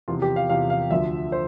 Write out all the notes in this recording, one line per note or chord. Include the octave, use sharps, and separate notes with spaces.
E2 C3 F3 F4
G4
F5
E2 C3 F3 F5
F5
D2 D3 F3 E5
C5